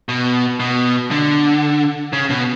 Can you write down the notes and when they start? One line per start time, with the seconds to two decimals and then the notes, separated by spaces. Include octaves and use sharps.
0.09 B2
0.60 B2
1.11 D3
2.13 C#3
2.30 B2